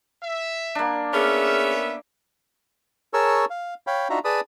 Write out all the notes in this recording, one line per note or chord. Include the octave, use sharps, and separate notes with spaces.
E5
A#3 D4
B3 C#4 G#4 A#4 E5
G#4 A#4 C#5 A5 C#6 E6
F5
C#5 F5 G5 B5
D4 D#4 F4 F#4 E5 A#5
G#4 B4 D5 A5 B5 D#6